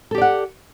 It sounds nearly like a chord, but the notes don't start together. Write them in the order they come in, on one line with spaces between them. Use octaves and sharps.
A4 G4 D5 F#5